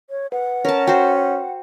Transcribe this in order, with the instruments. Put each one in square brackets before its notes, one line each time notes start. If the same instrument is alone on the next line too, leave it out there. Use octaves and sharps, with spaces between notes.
[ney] C#5
[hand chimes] B4 [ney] F#5
[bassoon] C#4 [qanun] A#4 A5
[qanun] F#4 C5 [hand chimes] G5